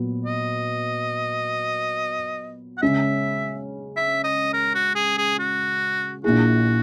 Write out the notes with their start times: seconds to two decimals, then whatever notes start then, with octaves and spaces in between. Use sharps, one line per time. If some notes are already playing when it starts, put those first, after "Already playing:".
Already playing: A#2 F#3 B3
0.25 D#5
2.78 F#5
2.82 C#3 G#3 C#4 E5
3.97 E5
4.24 D#5
4.53 A#4
4.75 F#4
4.95 G#4
5.18 G#4
5.39 F#4
6.24 A#1 A#2 A#3 E4 F#4 G#4